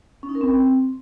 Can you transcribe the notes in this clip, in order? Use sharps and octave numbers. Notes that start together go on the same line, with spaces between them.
C#4
D#4
A#4
C4